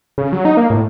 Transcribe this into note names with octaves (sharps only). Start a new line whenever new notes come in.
C#3
F#3
D#4
A#3
A2